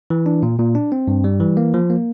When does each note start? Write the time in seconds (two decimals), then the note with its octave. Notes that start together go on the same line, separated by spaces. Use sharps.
0.10 E3
0.26 D4
0.43 A#2
0.59 A#2
0.75 D4
0.92 C4
1.08 G2
1.24 G3
1.40 E3
1.57 A#3
1.74 F3
1.90 A#3